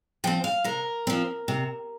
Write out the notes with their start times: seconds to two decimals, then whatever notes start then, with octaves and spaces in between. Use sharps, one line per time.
0.24 F3 C4 G5
0.44 F5
0.64 C3 A#4
1.07 F3 C4
1.48 C3